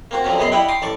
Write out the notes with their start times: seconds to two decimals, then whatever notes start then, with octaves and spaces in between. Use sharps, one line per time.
0.11 A#3 C4 F#4
0.24 D3 F3 F#3 C4 C#4
0.38 F#2 B2 F#3 G#4 D#5 C6
0.52 G3 E4 D#5 E5 F#5 G5
0.68 G5 A#5 C6 D6 D#6
0.82 A1 D5 A5 C#6